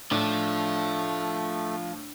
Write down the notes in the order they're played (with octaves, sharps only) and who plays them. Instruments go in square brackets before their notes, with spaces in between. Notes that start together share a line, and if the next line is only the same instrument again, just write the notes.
[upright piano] A2 [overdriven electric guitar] F3 [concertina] A3 [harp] D4